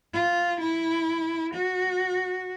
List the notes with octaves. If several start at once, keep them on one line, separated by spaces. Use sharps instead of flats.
F4
E4
F#4